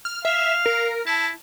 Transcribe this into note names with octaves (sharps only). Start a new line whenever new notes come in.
F6
E5 F5
A#4
E4 A5